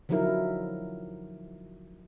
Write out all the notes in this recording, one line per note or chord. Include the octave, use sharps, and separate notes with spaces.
D3 F3 F#3 D#4 E4 A#4